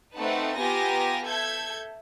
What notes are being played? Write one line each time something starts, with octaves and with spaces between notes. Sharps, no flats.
A3 C4 D#4 B4 F#5 A5
B3 F4 G4 G#5 A#5 A#6
A4 E5 G6 G#6